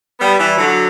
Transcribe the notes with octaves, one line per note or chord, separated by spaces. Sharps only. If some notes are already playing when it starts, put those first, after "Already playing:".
G3 B3
E3 G3
D3 F#3